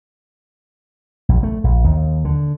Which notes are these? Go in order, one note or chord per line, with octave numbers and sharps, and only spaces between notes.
A#1
A3
A#1
D#2
D3